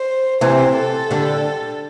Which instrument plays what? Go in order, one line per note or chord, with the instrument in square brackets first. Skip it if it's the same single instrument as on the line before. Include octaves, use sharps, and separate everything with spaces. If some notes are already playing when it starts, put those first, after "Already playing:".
Already playing: [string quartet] C5
[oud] C3 E3 [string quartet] C5
[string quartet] A4
[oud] D3 G3